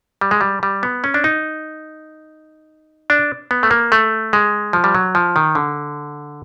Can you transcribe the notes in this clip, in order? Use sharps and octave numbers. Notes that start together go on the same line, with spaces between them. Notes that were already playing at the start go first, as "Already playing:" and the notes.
G3
G#3
G3
G3
B3
C#4
D4
D#4
D4
B3
A3
A#3
A3
G#3
F3
G3
F#3
F3
D#3
D3